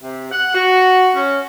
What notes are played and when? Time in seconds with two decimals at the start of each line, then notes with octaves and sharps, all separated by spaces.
0.02 C3
0.31 F#5
0.54 F#4
1.14 C#4